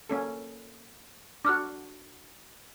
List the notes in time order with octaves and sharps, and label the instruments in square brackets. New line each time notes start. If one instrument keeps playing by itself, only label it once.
[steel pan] A#3 C#4 A4
[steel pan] D4 F#4 [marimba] D6 F6 F#6